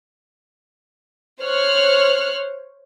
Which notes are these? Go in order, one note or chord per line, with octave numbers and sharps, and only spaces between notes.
C5 C#5 F6 F#6